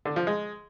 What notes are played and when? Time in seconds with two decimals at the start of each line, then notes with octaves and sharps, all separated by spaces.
0.05 D3
0.16 F3
0.27 G#3